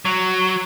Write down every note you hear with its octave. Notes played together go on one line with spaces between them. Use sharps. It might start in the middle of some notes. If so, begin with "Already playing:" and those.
F#3